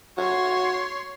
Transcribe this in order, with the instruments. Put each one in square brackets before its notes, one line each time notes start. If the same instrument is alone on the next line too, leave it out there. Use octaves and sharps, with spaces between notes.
[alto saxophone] F#4 [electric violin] C#5 C6